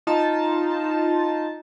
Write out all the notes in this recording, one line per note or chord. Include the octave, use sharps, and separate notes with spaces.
D#4 F4 A5